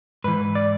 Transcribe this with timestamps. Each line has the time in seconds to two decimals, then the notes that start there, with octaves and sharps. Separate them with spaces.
0.24 G#2 E3 B4
0.55 D5